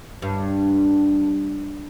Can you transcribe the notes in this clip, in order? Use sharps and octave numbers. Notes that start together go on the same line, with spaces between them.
G2